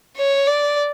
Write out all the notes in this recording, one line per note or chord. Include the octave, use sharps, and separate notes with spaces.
C#5
D5